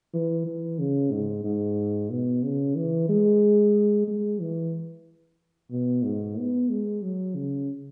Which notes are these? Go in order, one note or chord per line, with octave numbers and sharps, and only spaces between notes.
E3
E3
C#3
G#2
G#2
B2
C#3
E3
G#3
G#3
E3
B2
G#2
B3
G#3
F#3
C#3